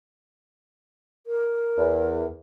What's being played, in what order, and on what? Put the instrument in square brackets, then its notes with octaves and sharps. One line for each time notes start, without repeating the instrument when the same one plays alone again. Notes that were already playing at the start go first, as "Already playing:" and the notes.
[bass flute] A#4
[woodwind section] E2